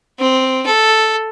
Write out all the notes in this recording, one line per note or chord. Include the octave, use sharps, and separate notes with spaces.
C4
A4